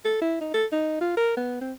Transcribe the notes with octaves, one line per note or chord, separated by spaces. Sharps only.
A4
E4
D#4
A4
D#4
F4
A#4
B3
C4